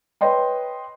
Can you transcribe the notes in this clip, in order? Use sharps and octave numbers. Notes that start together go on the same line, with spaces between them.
B4 C#5 D#5 G5 C6